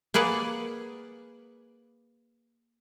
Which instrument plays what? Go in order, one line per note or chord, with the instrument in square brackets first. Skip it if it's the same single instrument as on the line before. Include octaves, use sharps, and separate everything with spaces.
[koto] A#3 G#4 B4 D5 F#5